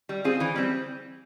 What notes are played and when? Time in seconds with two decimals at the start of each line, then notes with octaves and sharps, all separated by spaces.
0.09 G3
0.24 C4 F4 G#4
0.40 E3
0.56 G3 C4